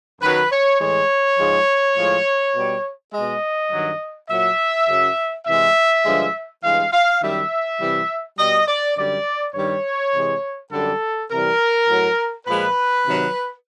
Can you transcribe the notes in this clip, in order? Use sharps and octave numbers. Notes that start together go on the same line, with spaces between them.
F#2 D#3 F#3 B4
C#5
A2 E3 G#3 C#5
G#2 F3 G#3
A2 F3 G#3
B2 G3
B2 G#3 D#5
G2 D#3 F#3
A#2 F#3 E5
F#2 C#3 F#3
C3 E3 G#3 E5
G2 D3 F3 G#3
G2 E3 G#3 F5
F5
F#2 D#3 G3 E5
C3 E3 G3
B2 G3 D#5
D5
F#2 D3 G3 D5
G2 D#3 G3 C#5
C3 E3 G#3
F#2 D3 G3 A4
C3 E3 G3 A#4
A2 F#3
A#2 F3 G#3 B4
C3 D#3 F#3